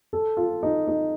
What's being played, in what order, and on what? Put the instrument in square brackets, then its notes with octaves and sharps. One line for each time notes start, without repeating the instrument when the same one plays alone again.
[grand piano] A4
F4
D#4
D#4